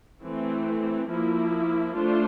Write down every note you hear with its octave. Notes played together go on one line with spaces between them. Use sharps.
E3 A3 C4
F3 A#3 E4
A3 D4 F4 C5